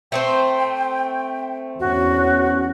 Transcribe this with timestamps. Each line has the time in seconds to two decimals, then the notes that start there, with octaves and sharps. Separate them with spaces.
0.12 A3 C4 C5 G5
1.80 E2 C#4 F#4